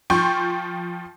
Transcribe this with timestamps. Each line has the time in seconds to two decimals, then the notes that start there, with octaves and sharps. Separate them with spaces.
0.10 F3 G5 C6 C#6 G6